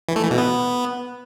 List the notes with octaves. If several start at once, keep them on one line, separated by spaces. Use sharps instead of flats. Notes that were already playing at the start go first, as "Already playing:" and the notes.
E3
A3
E3
B2
B3